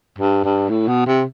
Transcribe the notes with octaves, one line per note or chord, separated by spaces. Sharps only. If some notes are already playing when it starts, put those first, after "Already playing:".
G2
G2
A2
B2
C3